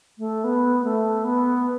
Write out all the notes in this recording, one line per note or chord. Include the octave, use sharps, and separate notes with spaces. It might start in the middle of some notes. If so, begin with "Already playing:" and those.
A3
B3
A3
B3